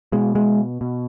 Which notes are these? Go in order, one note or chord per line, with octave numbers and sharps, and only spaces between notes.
B2 G#3
G#3
B2